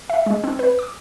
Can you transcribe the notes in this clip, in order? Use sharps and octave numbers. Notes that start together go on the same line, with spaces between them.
E5
G#3
C4
B4
D6